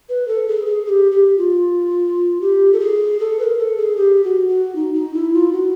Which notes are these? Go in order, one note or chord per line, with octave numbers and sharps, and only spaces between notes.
B4
A4
G#4
G#4
G#4
G4
G4
F4
G4
A4
G#4
A4
B4
A#4
A4
G#4
G4
F#4
F#4
D#4
D#4
E4
F4
F#4